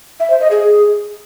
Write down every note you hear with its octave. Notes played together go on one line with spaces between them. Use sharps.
E5
C5
D#5
G#4